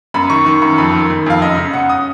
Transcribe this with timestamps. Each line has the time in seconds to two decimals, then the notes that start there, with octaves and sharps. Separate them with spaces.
0.14 F#2 B5
0.30 D#3 C#6
0.46 D#3
0.62 F#2
0.78 F2 B5
0.93 D#3
1.10 D#3
1.26 F2 F5
1.42 F#2 D#5
1.57 C#3
1.73 C#3 F#5
1.90 D#6